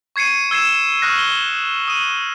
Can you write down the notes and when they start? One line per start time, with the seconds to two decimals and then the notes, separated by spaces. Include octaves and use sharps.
0.16 C#6 G#6 C7 C#7 D#7
0.51 E6 G#6 C7 E7
1.02 C#6 D#6 F6 F#6 A#6
1.18 G7
1.88 D#6 D#7